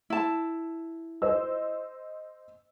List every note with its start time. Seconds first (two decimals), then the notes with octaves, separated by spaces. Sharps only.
0.10 E4 A5
1.22 C5 D#5 E6